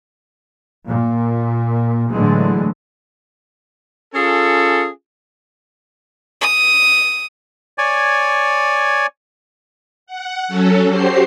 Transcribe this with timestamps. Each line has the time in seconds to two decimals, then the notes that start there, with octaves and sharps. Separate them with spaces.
0.88 A#2
2.09 A2 D3 E3 F#3 G#3 A3
4.14 C#4 F4 G#4 A4
6.41 D#6
7.78 C#5 D5 G#5
10.07 F#5
10.48 F#3 C#4 A4
10.88 F#4 G4 C5 C7